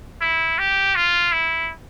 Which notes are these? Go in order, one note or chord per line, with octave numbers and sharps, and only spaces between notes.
E4
G4
F4
E4